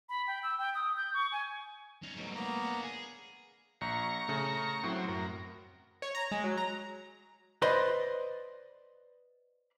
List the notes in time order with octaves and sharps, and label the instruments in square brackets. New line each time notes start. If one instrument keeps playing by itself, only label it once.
[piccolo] B5
G5
E6
G5
D#6
G6
C#6
G#5
[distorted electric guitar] C#4 D#4
[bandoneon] G#2 B2 F#3 [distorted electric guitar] G3 A3
[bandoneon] A#3 B3 A#5
[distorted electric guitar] D4 C#5
[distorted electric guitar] G#4 [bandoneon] G#5
[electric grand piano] A#1 [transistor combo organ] A#5 C#6
[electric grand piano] C#3 A3
[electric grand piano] A2 [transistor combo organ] F#3 C4
[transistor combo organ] F#2 A#4
[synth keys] C#5
A#5
G#3
F#3
A#5
[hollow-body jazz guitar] B4 C5 D5 D#5 B5 C6